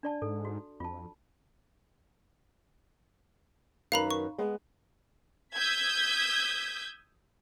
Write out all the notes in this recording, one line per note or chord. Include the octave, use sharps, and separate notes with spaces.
D4 D5 A5
G#2 A4
F#4
F2 F4 A5
F#2 D#3 B4 F5 A#5 B5
C#6
G#3 B3
D#6 E6 G6 G#6 B6